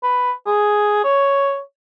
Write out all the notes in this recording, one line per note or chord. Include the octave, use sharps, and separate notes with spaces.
B4
G#4
C#5